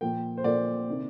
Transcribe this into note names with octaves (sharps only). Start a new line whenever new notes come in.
A#2 F3 A#3 G5
C5
A#2 F3 A#3 D5
C3 D#3